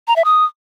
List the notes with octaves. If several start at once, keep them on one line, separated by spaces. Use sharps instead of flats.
A#5
E5
D#6